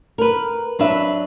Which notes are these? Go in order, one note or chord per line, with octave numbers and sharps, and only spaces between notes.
A#4 B4
F#3 D4 B4 E5